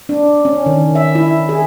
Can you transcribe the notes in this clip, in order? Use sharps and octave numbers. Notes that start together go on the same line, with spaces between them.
D4
C#4
D#3
E5
E4
G#4